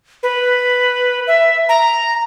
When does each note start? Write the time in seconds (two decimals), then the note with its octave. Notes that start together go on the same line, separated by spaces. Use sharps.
0.23 B4
1.27 E5
1.69 A#5